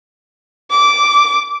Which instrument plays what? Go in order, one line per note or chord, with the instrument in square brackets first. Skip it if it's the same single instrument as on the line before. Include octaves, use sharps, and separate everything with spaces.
[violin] D6